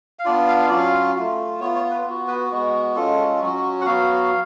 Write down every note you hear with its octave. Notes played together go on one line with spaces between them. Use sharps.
F5
B3 D4 F4 D5
F5
F5
F#3 C#4 F4 D5
F5
A3 F4
B3 F4 C#5
C#5
B4
B3 F#4
B4
G#3 B3 F#4
G#3 C#4 F4 A4
F#3 C#4 F#4
F#5
F#3 B3 F#4 F5